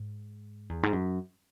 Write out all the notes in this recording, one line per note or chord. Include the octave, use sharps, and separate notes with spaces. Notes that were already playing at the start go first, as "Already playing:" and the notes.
Already playing: G#2
E2
G#2
F#2